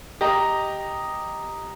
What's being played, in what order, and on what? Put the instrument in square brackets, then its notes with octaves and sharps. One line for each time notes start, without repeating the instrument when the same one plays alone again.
[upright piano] G4 D#5 A#5